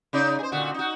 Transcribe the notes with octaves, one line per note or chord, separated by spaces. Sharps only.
C#3 D#4 D5
G#4 C5
A#2 D3 F#4
D#4 F#4